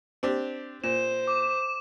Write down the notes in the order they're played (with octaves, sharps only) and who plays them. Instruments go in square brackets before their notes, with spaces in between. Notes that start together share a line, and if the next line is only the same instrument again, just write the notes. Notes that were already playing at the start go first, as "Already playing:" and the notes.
[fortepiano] C4 D4 G4
[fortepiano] A#2 [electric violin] C5 [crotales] E7
[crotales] D6